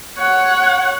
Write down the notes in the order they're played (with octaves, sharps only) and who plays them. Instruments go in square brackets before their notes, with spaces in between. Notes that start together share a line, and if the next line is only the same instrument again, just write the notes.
[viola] C#5 F#5